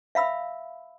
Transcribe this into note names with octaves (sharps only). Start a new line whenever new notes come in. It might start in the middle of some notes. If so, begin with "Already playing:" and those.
E5 F5 B5 E6